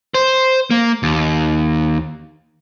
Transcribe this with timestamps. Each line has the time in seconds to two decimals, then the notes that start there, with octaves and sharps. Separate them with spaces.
0.15 C5
0.71 A#3
1.03 D#2